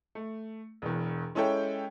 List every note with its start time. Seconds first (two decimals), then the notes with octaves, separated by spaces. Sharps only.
0.15 A3
0.82 E1 E2
1.35 G#3 C#4 E4 A4 C#5 G5